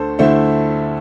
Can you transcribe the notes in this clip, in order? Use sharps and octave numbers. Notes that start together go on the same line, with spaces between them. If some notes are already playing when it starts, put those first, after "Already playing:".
Already playing: D2 D3 A3 A4 C5
D2 D3 A3 E4 C5 E5